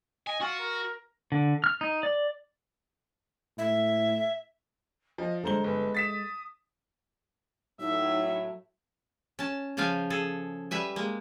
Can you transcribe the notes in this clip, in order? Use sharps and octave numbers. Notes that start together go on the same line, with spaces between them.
D#5 G#5
F4 F#4
A#4
D3
F6
D#4
D5
A2 E5
F3 D#5
D3 G#3 A4 C5 A#5 G7
G1 B4
D#6 A6 B6 E7
A2 F#3 D#4 E5
C#4 A5
C#3 F3 F4 F5 G5 G#5
G#4 A4
G3 B4 E5 G#5
G#3 A#3